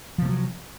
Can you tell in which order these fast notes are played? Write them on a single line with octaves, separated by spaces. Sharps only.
F3 C3 A3 F#3